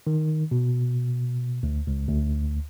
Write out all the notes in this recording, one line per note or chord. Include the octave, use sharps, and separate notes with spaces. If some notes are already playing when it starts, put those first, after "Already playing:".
D#3
B2
D2
C#2
D2